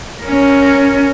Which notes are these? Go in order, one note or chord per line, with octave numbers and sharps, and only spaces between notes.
C#4 A#4